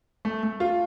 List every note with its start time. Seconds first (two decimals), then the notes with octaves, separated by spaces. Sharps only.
0.25 A3
0.43 A3
0.60 F4